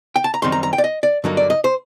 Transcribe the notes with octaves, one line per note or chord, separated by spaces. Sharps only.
G5
A5
A#5
F#2 D#3 G3 C4 D#4 C6
A#5
A#5
G5
D5
D#5
D5
G2 D3 F#3 A#3 D#4
D5
D#5
C5